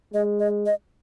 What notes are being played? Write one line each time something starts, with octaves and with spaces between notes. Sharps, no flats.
G#3 D#5
D#5
D#5